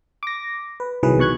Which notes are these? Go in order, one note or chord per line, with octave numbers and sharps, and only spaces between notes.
D6 A#6
B4
C2 D#3 E3 F#3 G#4 B4
B2 C#6 F#6 G#6